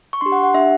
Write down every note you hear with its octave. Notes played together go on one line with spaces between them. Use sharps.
C#6
D4 G4 C6
F#5
F#5
D4 G4 E5